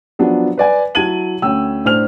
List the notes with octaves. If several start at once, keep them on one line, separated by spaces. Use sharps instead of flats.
F3 F#3 B3 D4
B4 D5 G#5
F#3 E4 A5 G#6 D#7 F#7
D2 C#4 G5 E6
A2 D4 C5 F6 F7